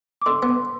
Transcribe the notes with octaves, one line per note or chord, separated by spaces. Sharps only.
D6
D3 C6
B3 C6